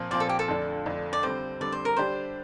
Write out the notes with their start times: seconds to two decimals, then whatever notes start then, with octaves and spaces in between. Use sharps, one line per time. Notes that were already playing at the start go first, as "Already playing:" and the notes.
Already playing: A#2 F3 C4
0.11 A#2 F3 C4 D5
0.20 A4
0.29 G4
0.39 A4
0.48 F2 D3 A3 D4
0.86 F2 D3 A3 D4
1.13 D5
1.23 D3 G3 C4 C5
1.61 D3 G3 C4 D5
1.72 C5
1.85 A#4
1.97 D3 G3 D4 G4 C5